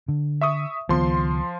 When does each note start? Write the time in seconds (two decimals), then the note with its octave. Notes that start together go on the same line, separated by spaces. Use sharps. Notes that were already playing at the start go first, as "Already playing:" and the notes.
0.08 D3
0.41 E5 C#6 D#6
0.89 C#2 D#3 F3 B3 C6